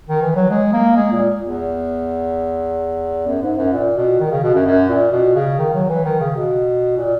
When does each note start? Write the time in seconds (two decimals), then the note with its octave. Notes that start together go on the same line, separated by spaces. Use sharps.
0.08 D#3
0.22 E3
0.36 F#3
0.50 G#3
0.73 A#3
0.96 G#3
1.12 A#2
1.42 E2
3.27 F#2
3.43 G#2
3.58 F#2
3.73 A#2
3.97 B2
4.20 D#3
4.31 C#3
4.43 B2
4.55 F#2
4.66 F#2
4.90 A#2
5.12 B2
5.35 C#3
5.59 D#3
5.74 F#3
5.89 E3
6.05 D#3
6.20 C#3
6.36 B2
6.98 A#2